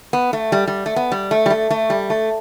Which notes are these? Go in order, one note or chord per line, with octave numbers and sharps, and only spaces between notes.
B3
A3
G3
G3
A3
B3
G3
A3
G3
A3
A3
G3
A3